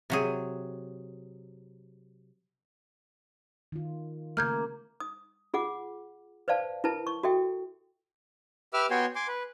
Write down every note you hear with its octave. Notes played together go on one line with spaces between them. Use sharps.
C3 F#3 G#4
D#3 F4
C#3 A3 A#3 F6 G6 G#6
D#6
F4 G#4 F#5 D6
B4 C5 D5 F5 A5
E4 A#4 B4 A5
C#6
F#4 A4 E5 G5
G4 B4 E5 D6 E6 F6
B3 F#4 C#5 G5 G#5 C6
G#5 C6 D6
B4